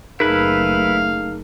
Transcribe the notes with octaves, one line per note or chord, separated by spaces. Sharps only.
F#1 A3 D#4 E4 G#4 A#4 B4 F5